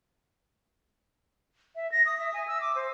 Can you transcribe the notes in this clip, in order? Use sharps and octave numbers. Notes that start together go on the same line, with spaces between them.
E5
A#6
D#6
E5
G#5
E6
D6
C5